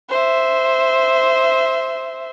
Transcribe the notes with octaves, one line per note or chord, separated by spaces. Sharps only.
C5 E5